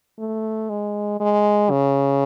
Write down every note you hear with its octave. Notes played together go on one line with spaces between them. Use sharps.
A3
G#3
G#3
C#3